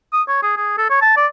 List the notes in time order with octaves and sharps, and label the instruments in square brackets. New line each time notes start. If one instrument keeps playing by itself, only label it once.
[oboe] D#6
C#5
G#4
G#4
A4
C#5
A5
D5